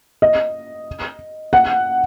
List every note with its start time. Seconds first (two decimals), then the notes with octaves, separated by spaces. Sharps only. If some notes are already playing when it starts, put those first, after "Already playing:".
0.22 D#5
1.53 F#5